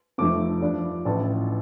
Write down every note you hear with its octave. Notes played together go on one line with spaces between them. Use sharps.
F1 F2 F3 A3 C4 D6
G2 F3 D4
A1 A2 F3 D4 A5